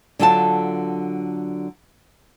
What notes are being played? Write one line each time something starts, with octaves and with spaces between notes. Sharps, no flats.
D3 F#3 F4 A4 F#5 A5